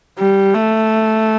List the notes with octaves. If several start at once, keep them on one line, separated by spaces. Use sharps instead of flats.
G3
A3